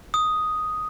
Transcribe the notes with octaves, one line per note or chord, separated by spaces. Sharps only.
D#6